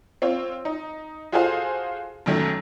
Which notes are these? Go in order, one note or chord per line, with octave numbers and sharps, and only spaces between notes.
C4 F4 C#5
D#4
F4 F#4 G#4 A4 C5 F5
B1 F#2 D#3 F#3 A3